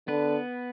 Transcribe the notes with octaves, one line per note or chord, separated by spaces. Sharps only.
D3 B3 B4